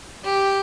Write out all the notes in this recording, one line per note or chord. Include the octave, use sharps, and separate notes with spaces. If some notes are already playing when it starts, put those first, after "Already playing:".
G4